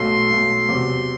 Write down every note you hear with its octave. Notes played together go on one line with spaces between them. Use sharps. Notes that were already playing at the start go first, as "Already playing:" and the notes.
Already playing: B1 B2 A3 C6
B1 B2 A3
E2 C3 F#3